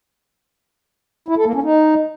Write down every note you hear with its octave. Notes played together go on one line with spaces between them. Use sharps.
E4
A4
A#3
C#4
D#4